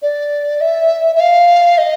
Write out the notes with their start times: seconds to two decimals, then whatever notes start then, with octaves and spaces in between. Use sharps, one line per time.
0.02 D5
0.60 E5
1.15 E5
1.20 F5
1.78 D#5